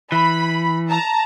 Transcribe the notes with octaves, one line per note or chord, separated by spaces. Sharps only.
E3 B5
A5 A#5